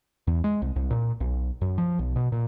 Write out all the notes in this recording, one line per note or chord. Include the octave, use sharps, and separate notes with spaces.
E2
G#3
C2
C2
A#2
B1
F#2
F3
B1
B2
A#2